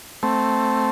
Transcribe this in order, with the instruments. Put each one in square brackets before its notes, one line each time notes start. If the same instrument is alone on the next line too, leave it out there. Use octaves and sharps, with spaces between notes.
[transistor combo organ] A3 C4